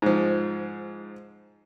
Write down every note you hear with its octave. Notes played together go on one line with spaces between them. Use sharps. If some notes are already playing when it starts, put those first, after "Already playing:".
G#2 F3